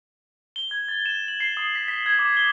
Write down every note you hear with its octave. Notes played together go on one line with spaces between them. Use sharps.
G7
G#6
A6
E7
F#7
C7
D#6
B6
B6
G#6
D6
G7